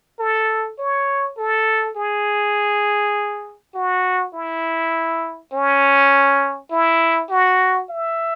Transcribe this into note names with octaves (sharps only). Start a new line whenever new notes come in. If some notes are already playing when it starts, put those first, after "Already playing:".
A4
C#5
A4
G#4
F#4
E4
C#4
E4
F#4
E5